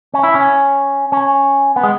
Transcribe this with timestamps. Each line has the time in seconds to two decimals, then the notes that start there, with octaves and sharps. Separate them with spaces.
0.14 C#4
0.23 E4
0.35 C#4
1.12 C#4
1.76 B3
1.83 G#3